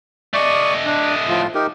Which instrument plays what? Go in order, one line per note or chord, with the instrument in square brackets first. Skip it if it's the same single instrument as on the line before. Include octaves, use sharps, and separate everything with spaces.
[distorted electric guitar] A3 D#5 [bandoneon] D5 C#6
[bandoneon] D4
A2 F3 F4
D#4 G4 A#4